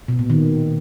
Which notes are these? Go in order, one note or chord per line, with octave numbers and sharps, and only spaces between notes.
B2
A#2
D#3